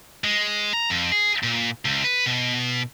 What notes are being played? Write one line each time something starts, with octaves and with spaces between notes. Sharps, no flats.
G#3
A#5
F2
G#4
A#2
C#2
B4
B2